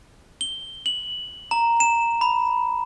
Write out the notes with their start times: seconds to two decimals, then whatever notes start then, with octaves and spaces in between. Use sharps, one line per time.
0.41 G7
0.86 F#7
1.51 A#5
1.80 E7
2.21 B5